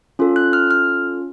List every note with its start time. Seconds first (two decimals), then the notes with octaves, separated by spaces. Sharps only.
0.19 C#4 F4 A4
0.36 F#6
0.53 F6
0.71 F6